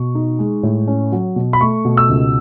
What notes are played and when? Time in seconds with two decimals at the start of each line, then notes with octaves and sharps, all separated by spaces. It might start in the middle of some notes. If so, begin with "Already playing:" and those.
Already playing: B2 C#6
0.15 D#4
0.39 G#3
0.63 A2
0.88 C#4
1.12 F#3
1.36 B2
1.53 B5
1.61 A3 C#6
1.85 B2
1.97 E6
2.09 C#2